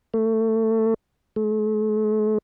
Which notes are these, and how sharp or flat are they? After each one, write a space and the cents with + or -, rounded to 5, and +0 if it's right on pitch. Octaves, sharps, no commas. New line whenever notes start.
A3 +20
A3 -45